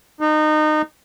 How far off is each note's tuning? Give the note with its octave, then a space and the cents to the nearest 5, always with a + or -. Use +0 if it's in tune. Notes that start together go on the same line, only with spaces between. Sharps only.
D#4 -25